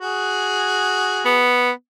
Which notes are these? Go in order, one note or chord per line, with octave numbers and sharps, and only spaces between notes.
F#4 G#4
B3